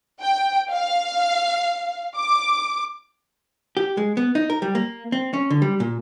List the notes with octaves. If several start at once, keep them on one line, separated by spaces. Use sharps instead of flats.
G5
F5
D6
G4
G#3
B3
D#4
A#4
G3
A#3
C4
C#4
D3
G3
A#2